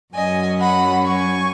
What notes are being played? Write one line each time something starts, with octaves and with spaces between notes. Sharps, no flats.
F#2 F#3 C#4 D#5 G#5
F#5 B5
G#5 C#6